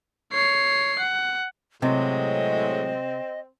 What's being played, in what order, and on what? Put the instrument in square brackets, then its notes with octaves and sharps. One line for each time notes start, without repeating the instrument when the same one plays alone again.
[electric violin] C#5 C7
F#5
[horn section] A2 F#3 G#3 [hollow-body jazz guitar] C3 [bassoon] C4 [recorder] D#5